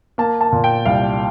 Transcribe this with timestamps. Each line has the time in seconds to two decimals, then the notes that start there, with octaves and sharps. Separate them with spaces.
0.18 A#3 A5
0.41 A5
0.52 A#2
0.64 G5
0.85 C2 F5